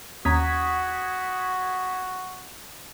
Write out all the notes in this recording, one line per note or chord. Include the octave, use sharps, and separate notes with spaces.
D#2 C#4 F#4 A#5 D#6 G#6 B6